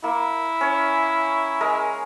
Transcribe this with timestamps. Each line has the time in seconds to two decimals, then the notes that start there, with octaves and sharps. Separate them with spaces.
0.04 A#3 E4
0.61 C#4 C#5
1.61 G#3 A#4